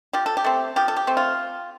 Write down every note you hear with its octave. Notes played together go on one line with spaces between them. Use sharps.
F3 G4
A4
G4
A3 C4
F3 G4
A4
G4
A3 C4
F4